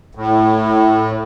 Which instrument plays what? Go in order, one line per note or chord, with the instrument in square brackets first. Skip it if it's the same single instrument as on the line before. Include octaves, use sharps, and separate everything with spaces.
[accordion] A2